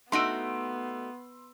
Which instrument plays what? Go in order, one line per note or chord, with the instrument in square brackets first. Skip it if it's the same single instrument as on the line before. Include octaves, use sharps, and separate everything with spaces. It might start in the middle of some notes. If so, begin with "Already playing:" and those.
[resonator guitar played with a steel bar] A3 D#4 F#4 [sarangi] B3 [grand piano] C6 E6 D7